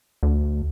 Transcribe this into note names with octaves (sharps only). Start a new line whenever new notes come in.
D2